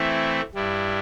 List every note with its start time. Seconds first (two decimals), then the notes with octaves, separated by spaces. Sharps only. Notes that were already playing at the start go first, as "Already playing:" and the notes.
Already playing: E3 A3 C4 E4
0.55 G2 G3 E4